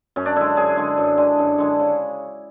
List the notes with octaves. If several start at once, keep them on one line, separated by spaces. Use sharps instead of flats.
F#2 C#4
D4
D3 G#3 E4
F#2 G#4
D3 G#3
F#2
D3 G#3
F#2
D3 G#3
C#3